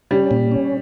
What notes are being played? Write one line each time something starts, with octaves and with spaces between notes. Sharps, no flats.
G3 C#4
A#2
C#4